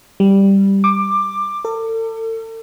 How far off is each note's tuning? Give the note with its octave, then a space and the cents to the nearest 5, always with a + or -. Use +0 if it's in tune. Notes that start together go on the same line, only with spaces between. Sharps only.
G3 +0
D6 +15
A4 +40